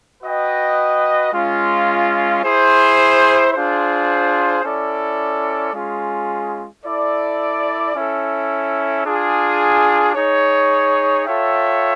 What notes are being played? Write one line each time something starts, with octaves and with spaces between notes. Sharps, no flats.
F#4 B4 D#5 G5
G#3 C#4 F4
E4 G#4 C5
D4 F4 G#4 C5
C#4 E4 A4 D5
G#3 C#4 F4 G#4
E4 A4 D5
C#4 E4 A4
D4 F4 G#4
D#4 G#4 C#5
F4 A4 C#5 E5 G5